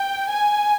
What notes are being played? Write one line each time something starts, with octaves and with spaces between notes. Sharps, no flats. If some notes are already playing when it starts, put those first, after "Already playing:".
Already playing: G5
G#5